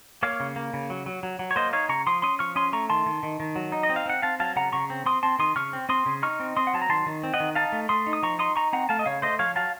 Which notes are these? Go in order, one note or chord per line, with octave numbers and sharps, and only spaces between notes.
A#3 C#5 F5
C#3
A#3
C#3
F#3
F#3
F#3
F#3
C#5
A#3 C5 D#5
D#4 C#5 F5
C#3 A#5 C#6
F3 C6 D#6
C#4 C6 D#6
F3 C#6 F6
C#4 C6 D#6
A3 A#5 C#6
D#3 A5 C6
D#3
D#3
D#3
F#3
D#4
D#5
C4
F5
C4 F#5
C4 F5 A5
F#3 F5 A5
C#3 F#5 A#5
C#3 A#5 C#6
C4
C4 C6 D#6
C4 A5 C6
D#3 C6 D#6
C#3 C#6 F6
C4
C4 C6 D#6
C#3
D#4 C#6 F6
C4
C4 C6 D#6
F#5
F#3 A5
A#5
D#3 A5 C6
D#3
C4
D#5 F#5
D#3
D#4 F5 A5
A3
A3 C6 D#6
D#4
D#6
F3 A#5 C#6
D#4 C6 D#6
D#4 A#5 C#6
C4 F#5 A#5
A3 F5 A5
D#5
C#3 C#5 F5
A3 C5 D#5
F3 C#5 F5
F#3 F5 A5